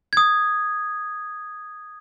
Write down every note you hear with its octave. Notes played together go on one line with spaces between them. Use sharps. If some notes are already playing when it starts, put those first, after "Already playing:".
D#6 G#6